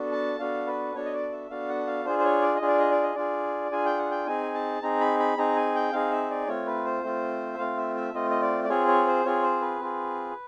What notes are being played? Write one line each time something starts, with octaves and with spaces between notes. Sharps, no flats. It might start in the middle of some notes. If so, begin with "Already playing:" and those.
Already playing: B3 D4 F#4 A4
A5
B3 D4 F#4 A4 F5
B4
B3 D4 F#4 A4 C#5
D#5
D5
E5
B3 D4 F#4 A4 F5
F#5
F5
D4 F4 G#4 C5
C5
C#5
D5
D#5
D4 F4 G#4
D5
D#5
D5
D#5
D4 F4 G#4 D5
D4 F4 G#4 G#5
G5
F#5
G5
C4 D#4 G#4 G#5
A5
C4 D#4 G#4 A#5
B5
B5
C4 D#4 G#4 A#5
G#5
G5
C4 D#4 G#4 F5
E5
D5
A3 C4 F4 C#5
B4
C5
A3 C4 F4
E5
A3 C4 F4 F5
E5
E5
A3 C4 F4 D#5
D#5
D5
D5
C4 F4 G#4 C#5
C#5
C5
C4 F4 G#4 C#5
C5
B4
C4 F4 G#4